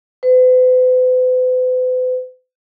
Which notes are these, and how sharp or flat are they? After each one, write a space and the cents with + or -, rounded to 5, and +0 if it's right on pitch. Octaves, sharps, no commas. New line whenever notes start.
B4 +45